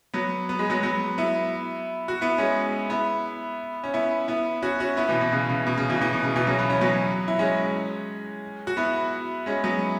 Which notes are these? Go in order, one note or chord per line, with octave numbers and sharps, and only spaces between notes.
F#3 B3
B3
G#3
F#3 B3
F#3 B3
B3 E4
F#4
B3 E4
G#3 C#4
B3 E4
C#4
B3 E4
B3 E4
C#4 F#4
C#4 F#4
B3 E4
B2 E3
B2
C#3
C#3
B2
C#3
B2 E3
B2 E3
B2
C#3
B2 E3
C#3 F#3
B3
C#4
F#3 B3
E4
G#3 C#4
F#4
B3 E4
G#3 C#4
F#3 B3